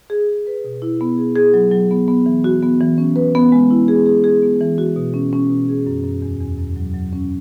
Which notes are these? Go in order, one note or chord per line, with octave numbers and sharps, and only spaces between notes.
G#4
G#4
B4
B2
E4
B3
G#4
G#4
F#3
F#3
B3
B3
E3
F#4
B3
E3
C#4
B4
B3
G#3
E4
G#4
G#4
G#4
B3
E3
F#4
B2
C#4
C#4
B2
G#4
F#2
F#2
E2
E2
F#2
F#3
F#3
C#4